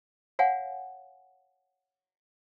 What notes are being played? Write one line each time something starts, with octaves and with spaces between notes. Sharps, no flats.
C#5 F5 F#5 G#5